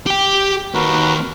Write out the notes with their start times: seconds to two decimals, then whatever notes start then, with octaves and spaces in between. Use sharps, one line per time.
0.07 G4 G5
0.75 D#2 F#4 A#4 B4